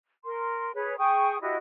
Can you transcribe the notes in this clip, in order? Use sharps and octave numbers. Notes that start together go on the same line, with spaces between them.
A#4 C6
G#4 B4 C#5
G#4 G5 C#6 D#6
E4 F#4 G4 D#5